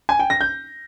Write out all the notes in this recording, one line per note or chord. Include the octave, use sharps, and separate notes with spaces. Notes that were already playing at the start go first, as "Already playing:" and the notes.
G#5
G5
A#6
G6